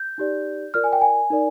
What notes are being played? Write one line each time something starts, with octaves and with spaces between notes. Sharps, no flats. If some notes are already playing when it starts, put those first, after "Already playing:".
Already playing: G6
D#4 G4 D5
F4 A#4 D5 F6
G#5
G5
G#5
D#4 A#4 D5